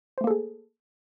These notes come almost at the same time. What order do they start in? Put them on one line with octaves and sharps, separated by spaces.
C5 A3 A#3 A4 G#4